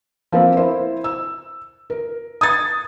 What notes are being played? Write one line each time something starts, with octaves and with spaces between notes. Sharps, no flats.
F3 A#3 C4
E4 A#4 C5
E6
A#4
D#6 G#6 A6